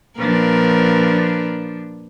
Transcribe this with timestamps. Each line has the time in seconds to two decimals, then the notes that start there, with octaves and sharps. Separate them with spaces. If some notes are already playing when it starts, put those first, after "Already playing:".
0.18 A#2 F3 D4 A#4 B4